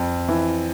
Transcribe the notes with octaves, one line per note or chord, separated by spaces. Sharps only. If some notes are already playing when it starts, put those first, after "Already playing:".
Already playing: F2
E3